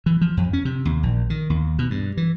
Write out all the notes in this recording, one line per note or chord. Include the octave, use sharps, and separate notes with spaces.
E3
F3
F2
C#4
C3
D#2
A#1
D#3
D#2
B2
G2
E3